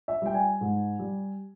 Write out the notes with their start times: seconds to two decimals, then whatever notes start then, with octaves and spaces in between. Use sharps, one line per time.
0.08 E5
0.22 G3 G5
0.34 G#5
0.61 G#2
0.99 G3